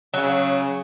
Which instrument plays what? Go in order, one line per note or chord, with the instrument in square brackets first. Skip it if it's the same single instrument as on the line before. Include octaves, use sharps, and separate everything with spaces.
[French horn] C#3 [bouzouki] F#3